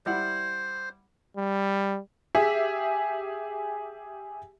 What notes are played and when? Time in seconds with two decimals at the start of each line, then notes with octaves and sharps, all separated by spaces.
0.06 G3 E4 C5 F#5
1.37 G3
2.35 G4 G#4 E5